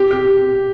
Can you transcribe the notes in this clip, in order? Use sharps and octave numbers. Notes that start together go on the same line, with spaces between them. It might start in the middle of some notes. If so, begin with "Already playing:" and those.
Already playing: G4
G4